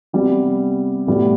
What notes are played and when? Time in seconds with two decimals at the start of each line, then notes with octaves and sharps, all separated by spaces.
0.13 C3 G3 B3
1.07 A2 G3 B3